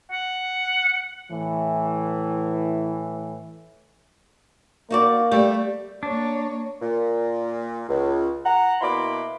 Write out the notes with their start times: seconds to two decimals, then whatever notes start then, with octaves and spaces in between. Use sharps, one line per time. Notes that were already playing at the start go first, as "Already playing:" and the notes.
0.12 F#5
1.30 A2 E3
4.90 A#3 D#4 F#4 D5
5.32 G3 A3 G4 D5
6.03 A#3 D4 C#5
6.82 A#2
7.89 C#2
8.45 F#5 A#5
8.81 B2 A#3 E4 B5 C6 D6